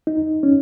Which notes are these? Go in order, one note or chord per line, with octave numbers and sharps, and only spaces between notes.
D#4
C#4